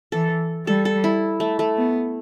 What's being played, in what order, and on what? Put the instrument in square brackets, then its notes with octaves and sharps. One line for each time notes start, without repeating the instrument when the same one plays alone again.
[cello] E3 [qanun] A4
[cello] G3 [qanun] A4
[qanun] A4
E4
A3
A3
[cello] B3